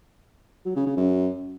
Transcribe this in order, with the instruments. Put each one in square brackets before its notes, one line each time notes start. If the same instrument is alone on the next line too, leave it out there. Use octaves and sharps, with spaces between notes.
[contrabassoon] F#3
C#3
C#3
F#2